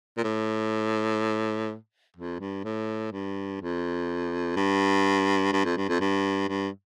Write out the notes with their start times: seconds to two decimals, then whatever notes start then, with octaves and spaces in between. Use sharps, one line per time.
0.17 A#2
0.24 A2
2.17 F2
2.40 G2
2.64 A2
3.12 G2
3.61 F2
4.56 G2
5.53 G2
5.65 F2
5.77 G2
5.89 F2
6.00 G2
6.49 G2